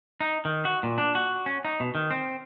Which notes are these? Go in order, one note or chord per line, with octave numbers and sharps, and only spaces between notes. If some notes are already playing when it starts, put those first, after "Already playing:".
D#4
D#3
F#4
A#2
D4
F#4
C#4
D#4
B2
D#3
C4